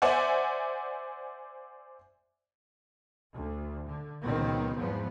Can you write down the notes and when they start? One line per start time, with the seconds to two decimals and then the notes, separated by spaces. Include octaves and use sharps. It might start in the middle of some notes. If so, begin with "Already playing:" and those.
0.02 C5 D5 E5 F#5 G#5
3.33 D2
3.89 D3
4.24 C#2 A#2 D#3 F#3 B3 C4
4.78 E2 G#2 F3 F#3 B3